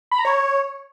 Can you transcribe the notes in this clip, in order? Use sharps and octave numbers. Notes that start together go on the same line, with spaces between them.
B5
A#5
C#5